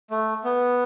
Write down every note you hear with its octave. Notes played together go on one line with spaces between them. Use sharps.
A3
B3